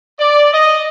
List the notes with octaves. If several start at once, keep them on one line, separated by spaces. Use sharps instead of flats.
D5
D#5